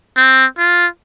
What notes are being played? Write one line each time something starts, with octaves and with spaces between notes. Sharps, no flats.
C4
F4